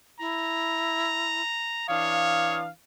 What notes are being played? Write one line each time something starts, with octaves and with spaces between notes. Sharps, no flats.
E4 A#5
E3 D4 C#5 F5 D#6